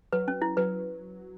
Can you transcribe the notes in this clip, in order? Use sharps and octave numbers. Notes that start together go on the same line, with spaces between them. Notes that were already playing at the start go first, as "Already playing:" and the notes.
F#3 B4
C#4
E4
F#3 B4